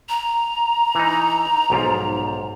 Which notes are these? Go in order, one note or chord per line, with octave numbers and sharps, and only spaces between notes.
A#5
E3 D#4
B1 G#2 F3